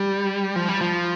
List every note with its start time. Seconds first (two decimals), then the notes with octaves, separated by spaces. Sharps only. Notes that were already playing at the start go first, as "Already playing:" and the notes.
Already playing: G3
0.56 F3
0.69 G3
0.81 F3